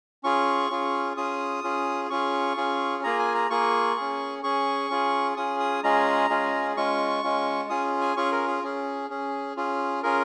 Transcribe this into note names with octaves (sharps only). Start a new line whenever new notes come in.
C#4 F4 G#4 C#6
C#4 F4 G#4
C#4 F4 G#4 D#6
C#4 F4 G#4
C#4 F4 G#4 C#6
C#4 F4 G#4
A#3 F4 G#4 A#5
G#5
A#5
A#3 F4 G#4 C#6
C#4 G#4
C#4 G#4 C#6
C#4 F4 G#4
C#4 F4 G#4 D#6
D#6
G#3 C#4 F4 G#4 A#5
G#3 C#4 F4 G#4
G#3 C#4 F4 C#6
G#3 C#4 F4
C#4 F4 G#4 D#6
G#5
C#4 F4 G#4 C#6
A#4
G#4
C#4 G#4
C#4 G#4
C#4 F4 G#4
C#4 F4 G#4 A#4